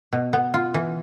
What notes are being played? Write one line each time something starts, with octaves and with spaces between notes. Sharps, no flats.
B2
B3
F4
E3